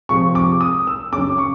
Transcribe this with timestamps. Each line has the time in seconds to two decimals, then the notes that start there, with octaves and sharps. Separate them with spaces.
0.09 C3 F3 G#3 C#6
0.35 D6
0.61 D#6
0.87 E6
1.13 C#3 F#3 D6
1.38 C#6